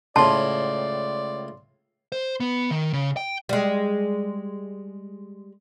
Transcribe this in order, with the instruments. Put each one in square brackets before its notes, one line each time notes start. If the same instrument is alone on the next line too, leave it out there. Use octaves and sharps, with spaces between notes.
[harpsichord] C#2 A2 [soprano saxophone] D5 [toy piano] A5 [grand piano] C6
[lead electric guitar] C5
B3
D#3
C#3
G5
[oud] G3 G#3